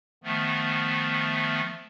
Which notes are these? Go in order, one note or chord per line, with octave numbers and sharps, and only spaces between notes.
D#3 F3 A3 B3